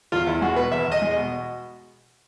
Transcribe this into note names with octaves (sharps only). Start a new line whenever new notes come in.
E2 F4
E2 E4
G#3 F#4
B2 B4
E2 E5
E2
D#5
G#3
D#5
B2